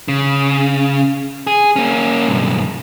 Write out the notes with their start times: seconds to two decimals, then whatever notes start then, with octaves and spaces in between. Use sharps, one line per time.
0.08 C#3
1.47 G#4
1.76 A#3 C#4
2.28 B1 G2